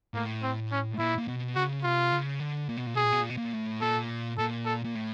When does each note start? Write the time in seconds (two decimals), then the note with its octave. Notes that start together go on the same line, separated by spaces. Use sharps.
0.14 A2 A#3
0.43 C4
0.71 C#4
0.99 A#2 E4
1.18 A#2
1.28 B2
1.56 C#3 F#4
1.83 C3 F4
2.12 C#3
2.40 D3
2.69 A#2
2.77 B2
2.86 A#2
2.94 B2 G#4
3.04 A#2
3.12 B2
3.21 A#2
3.30 B2
3.37 A#2
3.53 A2
3.81 A#2 A4
4.38 A#2 A4
4.66 A4
4.85 A#2
4.95 A2